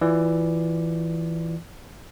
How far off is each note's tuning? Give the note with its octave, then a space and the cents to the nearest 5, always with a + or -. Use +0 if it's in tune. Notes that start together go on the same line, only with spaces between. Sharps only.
E3 +0 F4 +15 D5 +0